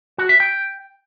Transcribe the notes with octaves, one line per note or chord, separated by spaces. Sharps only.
F#4
E5
G5